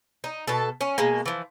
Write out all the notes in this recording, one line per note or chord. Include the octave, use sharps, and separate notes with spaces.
D#4
B2 A4
C#4
B2 G#3 A#3
E3 F3